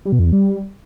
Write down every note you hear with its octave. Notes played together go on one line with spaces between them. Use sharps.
G3
B2
F2
E2
G3